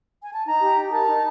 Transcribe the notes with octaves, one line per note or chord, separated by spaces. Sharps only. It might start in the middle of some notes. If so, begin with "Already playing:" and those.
G#5
A5
D#4 A#5
G4
D#4
A#4 A5
D#4